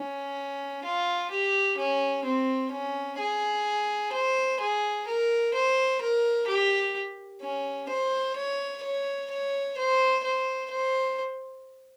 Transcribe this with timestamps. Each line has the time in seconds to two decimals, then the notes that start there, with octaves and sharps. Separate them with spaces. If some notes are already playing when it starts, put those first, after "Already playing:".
Already playing: C#4
0.84 F4
1.31 G4
1.78 C#4
2.26 C4
2.72 C#4
3.19 G#4
4.13 C5
4.61 G#4
5.08 A#4
5.54 C5
6.01 A#4
6.48 G4
7.42 C#4
7.89 C5
8.37 C#5
8.83 C#5
9.30 C#5
9.77 C5
10.24 C5
10.71 C5